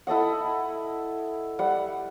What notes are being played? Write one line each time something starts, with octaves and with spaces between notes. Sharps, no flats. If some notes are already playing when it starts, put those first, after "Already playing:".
E4 A4 D#5 F#5
G3 F#5